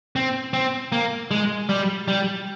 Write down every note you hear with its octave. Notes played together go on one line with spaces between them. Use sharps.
C4
C4
A#3
G#3
G3
G3